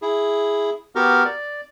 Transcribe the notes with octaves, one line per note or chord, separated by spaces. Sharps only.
E4 G#4
B3 F#4 G4 A#4 F6
D5